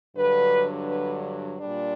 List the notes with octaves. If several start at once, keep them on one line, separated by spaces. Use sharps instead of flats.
G2 D3 F#3 B4
B4
A#2 G3 D4